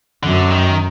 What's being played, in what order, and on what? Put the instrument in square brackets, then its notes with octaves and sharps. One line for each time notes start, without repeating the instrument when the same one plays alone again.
[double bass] F#2 [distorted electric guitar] D3
[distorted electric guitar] D#3